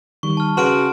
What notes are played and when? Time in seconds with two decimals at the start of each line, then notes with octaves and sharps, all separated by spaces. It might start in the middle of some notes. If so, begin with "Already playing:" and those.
0.23 D#3 G3 C#6
0.37 A5 F6
0.57 C#3 F#4 B4 F#5 C6 F6 D7